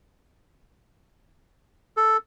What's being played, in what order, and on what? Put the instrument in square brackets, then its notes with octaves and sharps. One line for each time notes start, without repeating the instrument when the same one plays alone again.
[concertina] A4